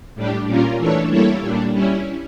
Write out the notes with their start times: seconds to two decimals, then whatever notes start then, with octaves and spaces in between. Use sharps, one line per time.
0.15 A2 G3 D4 G4
0.47 A#2 G3 C#4 F4 A#4
0.78 E3 A3 D4 A4 C#5
1.10 G3 A#3 E4 A4 C#5
1.41 A#2 G3 D4
1.73 G3 C#4 E4